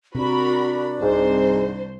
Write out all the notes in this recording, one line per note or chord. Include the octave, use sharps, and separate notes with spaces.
C3 D4 F#4 A#4 B5
C2 G#2 C5